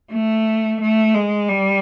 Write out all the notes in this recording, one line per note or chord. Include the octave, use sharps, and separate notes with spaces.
A3
A3
G#3
G3